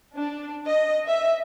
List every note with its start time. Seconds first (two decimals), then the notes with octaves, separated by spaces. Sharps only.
0.16 D4
0.67 D#5
1.08 E5